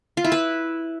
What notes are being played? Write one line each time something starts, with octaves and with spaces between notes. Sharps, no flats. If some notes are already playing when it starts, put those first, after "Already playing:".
F4
E4
B4